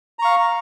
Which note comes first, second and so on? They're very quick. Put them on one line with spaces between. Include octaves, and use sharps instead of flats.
A#5 C#6 F5